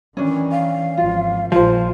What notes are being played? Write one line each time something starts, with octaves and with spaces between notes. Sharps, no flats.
D#3 E3 C#4 D4
F5
G#1 F3 F4
A#1 F3 F4 G#4 C5 F5